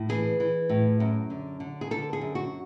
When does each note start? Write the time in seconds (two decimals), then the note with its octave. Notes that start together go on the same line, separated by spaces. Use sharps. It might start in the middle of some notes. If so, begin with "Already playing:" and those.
Already playing: A2
0.09 E3 G#4
0.40 E3
0.69 A2
1.00 F#2
1.30 D3
1.60 D3
1.81 G#4
1.91 D3 A4
2.13 G#4
2.21 F#2
2.35 F#4